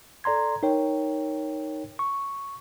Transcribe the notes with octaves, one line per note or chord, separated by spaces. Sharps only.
A4 D5 A#5 C6 G#6
D#4 A#4 C#5 G5
C#6